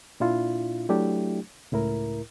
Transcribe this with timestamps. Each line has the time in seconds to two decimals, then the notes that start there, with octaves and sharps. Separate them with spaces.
0.20 A#2 D4 E4 F4
0.89 F#3 A3 D4 E4 G4
1.72 C#2 A2 E4 A#4